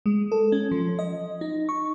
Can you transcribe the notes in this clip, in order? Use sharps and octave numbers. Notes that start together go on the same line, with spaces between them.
G#3
A4
C#4
F3
D#5
D#4
C#6